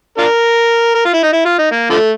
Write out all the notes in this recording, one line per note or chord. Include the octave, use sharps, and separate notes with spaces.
D4 F4 A#4
A#4
F4
E4
D#4
E4
F4
D#4
A#3
D3 F3 A3